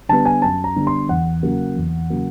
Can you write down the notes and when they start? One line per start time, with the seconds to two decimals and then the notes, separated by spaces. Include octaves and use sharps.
0.09 D3 G3 B3 A5
0.25 G#5
0.42 F#2 A5
0.64 A#5
0.76 D3 G3 B3
0.87 C6
1.09 E2 F#5
1.43 C#3 F#3 A#3
1.76 E2
2.10 C#3 F#3 A#3